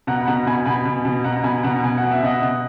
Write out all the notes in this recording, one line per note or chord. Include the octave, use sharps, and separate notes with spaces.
B2 F#5 A#5
B5
B2 F#5 A#5
B2 G#5 B5
B2 G#5 B5
B2
B2
B2 F#5 A#5
A#5
B2 G#5 B5
B2 F#5 A#5
B2 G#5
F#5
B2
E5
B2 D#5 F#5
B2